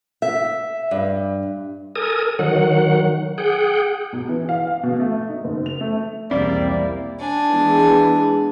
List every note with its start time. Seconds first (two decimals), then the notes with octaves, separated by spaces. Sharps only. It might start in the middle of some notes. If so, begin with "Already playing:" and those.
0.22 E5
0.91 G2
1.96 A4 A#4 G#5 D#6
2.39 D#3 F#3 F#5
3.38 G#4 F#5 G5
4.13 B1
4.29 E3
4.49 F5
4.67 F5
4.83 B2
5.00 A3
5.29 D#4
5.44 F#1
5.66 F7
5.81 A3
6.31 B1 E2 G3 A#3 C4 E4 D5
7.19 D4 G#5
7.52 E3 G#3 B3